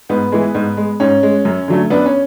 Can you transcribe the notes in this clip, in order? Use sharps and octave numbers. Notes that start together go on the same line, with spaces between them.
G#2 B3
E3 G#3
G#2
G#3
G#2 C#4
G#3
F#2
D3 F#3 A3
F#2 B3 D4
C#4